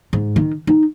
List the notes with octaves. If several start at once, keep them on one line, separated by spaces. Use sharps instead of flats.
G#2
D#3
D#4